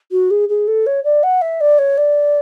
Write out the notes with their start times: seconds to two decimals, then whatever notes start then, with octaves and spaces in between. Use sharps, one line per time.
0.11 F#4
0.30 G#4
0.49 G#4
0.67 A4
0.86 C#5
1.04 D5
1.23 F#5
1.41 E5
1.60 D5
1.78 C#5
1.97 D5